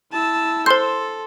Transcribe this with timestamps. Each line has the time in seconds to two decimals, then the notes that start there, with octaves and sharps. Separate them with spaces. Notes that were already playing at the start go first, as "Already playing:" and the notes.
0.12 E4 A5 E6
0.66 A4 C5 C6 G6